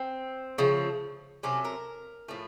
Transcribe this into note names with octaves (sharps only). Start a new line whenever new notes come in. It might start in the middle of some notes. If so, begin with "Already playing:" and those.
Already playing: C4
C#3 F3 A3
C3 F#3 A3 C#4
A#4
A2 F3 A3